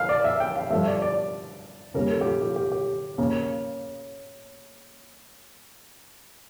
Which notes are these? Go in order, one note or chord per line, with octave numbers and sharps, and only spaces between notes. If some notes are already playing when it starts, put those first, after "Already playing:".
Already playing: F5
D5
E5
G5
F5
G2 F3 A3 E5
D5
D5
C#3 G3 A#3 A#4
A4
G4
F4
G4
G4
G4
C#3 A#3